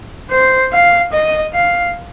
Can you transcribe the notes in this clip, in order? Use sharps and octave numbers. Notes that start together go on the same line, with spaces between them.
C5
F5
D#5
F5